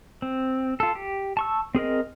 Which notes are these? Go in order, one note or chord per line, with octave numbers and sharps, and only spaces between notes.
C4
F4 A4
G4
A5 C#6 E6
C4 G#4 A#4 D#5